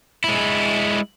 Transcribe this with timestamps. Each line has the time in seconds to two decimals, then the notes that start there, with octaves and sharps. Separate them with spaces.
0.24 G#3 E4